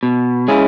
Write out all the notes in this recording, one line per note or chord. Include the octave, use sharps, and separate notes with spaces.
B2
G#3 C#4 E4 G#4